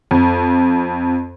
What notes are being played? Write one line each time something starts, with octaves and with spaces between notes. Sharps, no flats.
F2